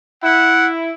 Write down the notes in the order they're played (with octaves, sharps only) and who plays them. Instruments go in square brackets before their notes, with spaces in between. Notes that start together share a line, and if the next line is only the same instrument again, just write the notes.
[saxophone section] E4 [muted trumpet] F#5